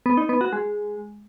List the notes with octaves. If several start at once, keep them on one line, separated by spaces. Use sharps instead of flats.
B3
D#4
B3
F#4
G#3